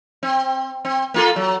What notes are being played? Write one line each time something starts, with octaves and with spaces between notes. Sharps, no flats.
C4
C4
A#3 F4 A4
F#3